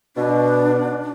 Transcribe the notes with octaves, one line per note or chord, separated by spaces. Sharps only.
B2 D4